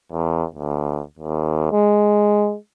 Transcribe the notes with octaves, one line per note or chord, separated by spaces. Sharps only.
E2
D2
D#2
G#3